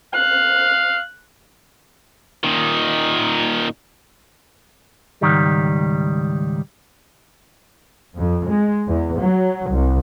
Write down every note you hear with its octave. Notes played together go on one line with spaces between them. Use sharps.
F5 F#6
A#2 D#3
C#2 G#2 D#3 G3
F2
G#3
E2
F#3
C2